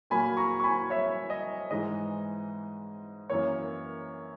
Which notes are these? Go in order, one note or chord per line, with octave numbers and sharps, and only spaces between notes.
A#2 F#3 A#3 G#5 B5
A#5 C#6
C#6
G#5 B5
C#5 E5
D#5
G#2 E3 G#3 D#5
F#2 E3 A#3 C#5